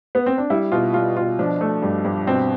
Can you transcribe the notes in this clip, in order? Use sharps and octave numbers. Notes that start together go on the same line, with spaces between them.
B3
C4
D4
G3 E4
B2 F4
G3 F4
B2 F4
F3 D4
A3
G2
G2
B2 C4